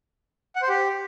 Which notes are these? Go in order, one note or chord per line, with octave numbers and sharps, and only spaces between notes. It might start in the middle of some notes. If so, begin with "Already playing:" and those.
F#5
C5
G4